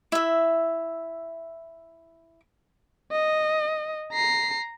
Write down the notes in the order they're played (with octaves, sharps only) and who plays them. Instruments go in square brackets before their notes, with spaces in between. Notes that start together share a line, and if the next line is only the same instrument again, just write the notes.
[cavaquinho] E4 E5
[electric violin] D#5
A#5 C7